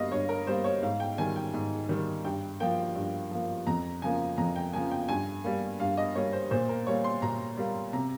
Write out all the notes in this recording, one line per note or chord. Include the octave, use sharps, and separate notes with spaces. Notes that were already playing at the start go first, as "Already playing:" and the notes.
Already playing: G2 G3 A#3 D#5 F5
G2 C#5
A#4
G3 A#3 C5
C#5
G#2 F5
G5
D#3 G3 G#5
G5
G#2
D#3 G3
G2 G5
F3 A#3 G5
G2
F3 A#3
F2 A#5
C#3 F3 A#3 G#5
F2 A#5
G5
C#3 F3 A#3 G#5
G5
G2 G#5
G3 A#3
G2 F5
D#5
G3 A#3 C#5
C5
A#2 C5
A#4
G3 A#3 C#5
C6
A#2 A#5
G3 A#3
C3 A#5